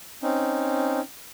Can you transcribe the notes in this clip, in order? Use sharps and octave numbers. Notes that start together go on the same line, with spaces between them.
C4 C#4 D#4